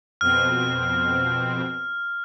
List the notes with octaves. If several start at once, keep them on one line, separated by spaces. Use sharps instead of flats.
F2 B2 C4 F6